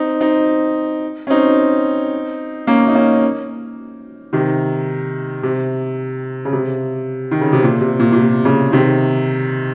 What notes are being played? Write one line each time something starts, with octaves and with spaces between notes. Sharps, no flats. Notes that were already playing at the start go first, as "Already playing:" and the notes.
Already playing: C4 D#4
C4 D#4
C#4
C4 D#4
A#3 C#4
D#4
A#3 C#4
C3 D#3
C3
C#3
C3
D#3
C#3
C3
A#2
C3
A#2
A#2
C3
A#2 C#3
C3 D#3